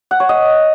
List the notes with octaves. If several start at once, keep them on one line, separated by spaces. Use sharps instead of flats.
F#5
C#5
D#5